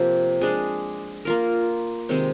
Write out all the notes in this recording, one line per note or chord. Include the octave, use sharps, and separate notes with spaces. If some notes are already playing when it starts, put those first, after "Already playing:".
Already playing: C3 F3 A#3
G#3 D4 G#4
A#3 F4 A#4
C3 D#3 G#3 C4